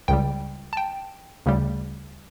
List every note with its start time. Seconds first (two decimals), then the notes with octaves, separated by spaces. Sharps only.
0.08 C#2 C#3 G3 G5
0.73 A5
0.77 G5
1.46 D2 C#3 G3